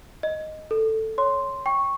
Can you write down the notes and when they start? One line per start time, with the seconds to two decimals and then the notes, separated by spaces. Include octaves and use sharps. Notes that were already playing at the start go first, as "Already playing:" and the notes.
0.23 D#5
0.71 A4
1.18 C#5 C6
1.66 G5 C#6